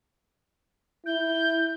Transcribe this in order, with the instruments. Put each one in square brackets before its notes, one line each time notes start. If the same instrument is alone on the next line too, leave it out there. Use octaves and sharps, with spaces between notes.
[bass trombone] E4 [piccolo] G6